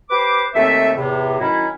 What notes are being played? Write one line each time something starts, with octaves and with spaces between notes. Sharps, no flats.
G4 B4 C5 D6
D#2 A3 C4 E5
E2 A2 C3
D#3 F#3 C#4 D#4 E4